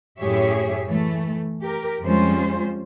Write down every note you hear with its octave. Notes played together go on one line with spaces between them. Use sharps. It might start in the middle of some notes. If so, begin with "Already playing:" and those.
F#2 A2 G4 G#4 C#5 E5
E3 A3
G4 A#4
F2 G3 G#3 C#4 F4 C5